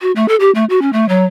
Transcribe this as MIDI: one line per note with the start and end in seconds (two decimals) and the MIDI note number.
0.01 0.11 66
0.16 0.26 57
0.28 0.36 69
0.40 0.51 67
0.55 0.65 57
0.70 0.81 66
0.82 0.93 61
0.93 1.08 57
1.09 1.24 54